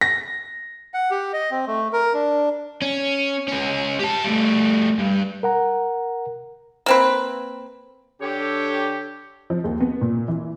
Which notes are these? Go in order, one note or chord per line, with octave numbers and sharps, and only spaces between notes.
A#6
F#5
G4
D#5
C4
A3
A#4
D4
C#4
C#2 C#4
G4 A5
G3 A3
G2
A#4 F#5 A#5
A#3 C4 B4
D3 G4 A4 C#5
F3
D#2
B3
A#2
E3